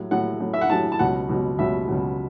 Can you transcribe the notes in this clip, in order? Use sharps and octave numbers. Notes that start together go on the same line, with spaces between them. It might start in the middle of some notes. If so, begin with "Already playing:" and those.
Already playing: A2 F#3
A2 F#3 F#5
A2 F#3
E5
F#5
A2 F#3 A5
A5
C#2 B2 F#3 F#5
C#2 B2 F#3
C#2 B2 F#3 E5
C#2 B2 F#3